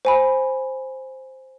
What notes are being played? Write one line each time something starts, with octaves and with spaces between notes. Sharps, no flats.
C5 G#5 B5